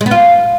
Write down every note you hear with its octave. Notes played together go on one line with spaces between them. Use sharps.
G#3
B3
F4